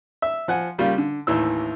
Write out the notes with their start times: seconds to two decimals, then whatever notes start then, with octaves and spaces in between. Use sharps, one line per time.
0.22 E5
0.48 F3 F#5 G#5
0.78 C#3 G3 A#3 F4
0.98 D3
1.27 A1 D#2 E3 E6